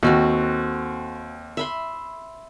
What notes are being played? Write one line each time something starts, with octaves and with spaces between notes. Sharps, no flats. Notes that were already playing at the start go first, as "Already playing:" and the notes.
D#2 C4 F#4 A4
E5 B5 C6